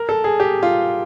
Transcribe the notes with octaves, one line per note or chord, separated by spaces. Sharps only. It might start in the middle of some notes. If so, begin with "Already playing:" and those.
Already playing: A#4
A4
G#4
G4
F4